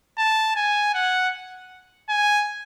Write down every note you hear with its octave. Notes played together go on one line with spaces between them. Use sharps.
A5
G#5
F#5
G#5